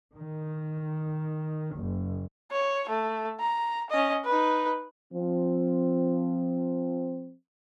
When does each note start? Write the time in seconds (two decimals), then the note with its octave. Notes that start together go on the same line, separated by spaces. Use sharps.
0.16 D#3
1.75 F#1
2.51 C#5
2.89 A3
3.40 A#5
3.90 C#4 D#5
4.25 D#4 B4
5.14 F3 C4